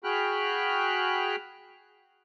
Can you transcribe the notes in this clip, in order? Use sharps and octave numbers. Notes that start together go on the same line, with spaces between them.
F#4 G#4 G5 B5 F6 F#6